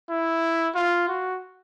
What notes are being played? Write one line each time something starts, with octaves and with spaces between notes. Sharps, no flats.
E4
F4
F#4